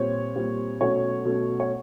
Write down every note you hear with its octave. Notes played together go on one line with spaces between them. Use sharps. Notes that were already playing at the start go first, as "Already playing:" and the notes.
Already playing: A#2 G3 C4 C#5
A#2 G3 C4
B2 F#3 A3 C#4 C#5
B2 F#3 A3 C#4
C#5